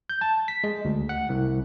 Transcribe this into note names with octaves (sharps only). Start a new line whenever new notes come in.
G6
A5
B6
G#3
D2
F#5
C2